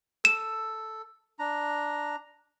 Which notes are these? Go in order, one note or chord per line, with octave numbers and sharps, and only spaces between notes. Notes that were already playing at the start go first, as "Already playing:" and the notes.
A4 E7
D4 A#5